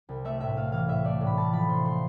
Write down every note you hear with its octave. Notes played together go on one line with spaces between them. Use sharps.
C2
A3 E5
A2 E5
A3 F5
E3 F5
A2 E5
A3 D5
A2
B5
A3 A5
F3 B5
C3 C6
A3 C6